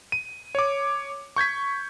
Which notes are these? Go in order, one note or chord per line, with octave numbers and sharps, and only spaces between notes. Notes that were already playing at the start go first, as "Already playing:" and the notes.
D#7
C#5 D6
C#6 G6 G#6 B6